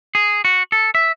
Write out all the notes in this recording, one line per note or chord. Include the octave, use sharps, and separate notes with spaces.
G#4
F#4
A4
E5